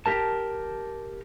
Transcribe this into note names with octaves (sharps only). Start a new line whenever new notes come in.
G4 A#4 A5